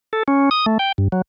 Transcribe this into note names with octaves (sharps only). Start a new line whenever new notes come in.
A4
C#4
D#6
A3
G5
G2
F#3